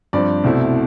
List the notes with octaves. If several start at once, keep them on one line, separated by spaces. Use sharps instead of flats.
G2 F3 C4 D5
C2 B2 A3 C4 E4